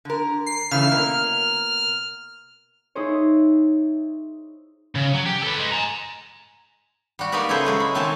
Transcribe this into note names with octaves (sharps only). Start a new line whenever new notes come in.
D3 A#4
C7
C#3 E3 A3 F6
B2 A#3 A#4
D#4 E4 G#4 C5 C#5
C#3
F#3
G4
A4 B4
G#3 D#4
G#5 A#5
G3 F#4
A#3 B3 D#4 B4 D5
C#3 E4 G#4 A4 C5
F#3 G#3 C#4
E4
B2 D#3 F#3 C4 G#5 A5